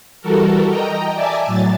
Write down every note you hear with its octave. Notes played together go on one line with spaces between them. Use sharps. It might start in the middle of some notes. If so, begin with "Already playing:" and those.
E3 G3 F#4 A4 A#4
D#5 G5 A#5
D5 E5 G#5 A5 D6
A2 F#3 A6